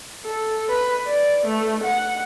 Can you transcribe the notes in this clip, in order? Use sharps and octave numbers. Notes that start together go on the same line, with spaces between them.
A4
B4
D5
A3
F#5